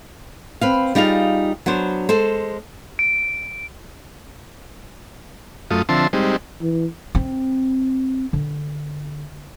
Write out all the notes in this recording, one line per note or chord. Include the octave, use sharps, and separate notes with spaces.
C4 B4 F5
G3 D#4 F4 G#4 F5
F#3 B3 D4 C5
G#3 A4 C5
D7
F#2 A3 F4 D#6
D3 F3 C4 E5 A5 C6
G3 G#3 C4 D#4
E3
C4
D3